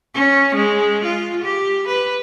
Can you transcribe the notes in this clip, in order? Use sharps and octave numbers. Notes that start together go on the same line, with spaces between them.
C#4
G#3
F4
G4
B4